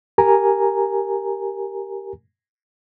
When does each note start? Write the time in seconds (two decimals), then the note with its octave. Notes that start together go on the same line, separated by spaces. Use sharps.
0.18 G4 A#4 G#5 A#5